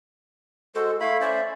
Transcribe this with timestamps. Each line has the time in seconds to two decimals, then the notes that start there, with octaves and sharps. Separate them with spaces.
0.75 G#3 F#4 A4 C5
1.00 A3 E4 F5 B5
1.21 C#4 C5 D5 E5